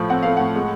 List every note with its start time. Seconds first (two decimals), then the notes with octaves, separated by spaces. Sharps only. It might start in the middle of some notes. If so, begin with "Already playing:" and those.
Already playing: A2 F3 A3
0.09 C4 F#5
0.23 A3 F5
0.37 A2 F#5
0.55 G#3